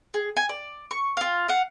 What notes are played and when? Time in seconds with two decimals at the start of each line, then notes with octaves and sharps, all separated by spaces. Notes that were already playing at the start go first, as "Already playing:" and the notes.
0.14 G#4
0.37 G#5
0.49 D5
0.91 C#6
1.17 F4 F5
1.48 F5 F#5